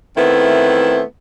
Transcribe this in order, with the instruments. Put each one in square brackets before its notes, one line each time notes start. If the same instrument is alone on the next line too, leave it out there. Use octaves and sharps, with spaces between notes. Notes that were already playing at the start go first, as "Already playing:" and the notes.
[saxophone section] D#3 A3 B3 C4 E4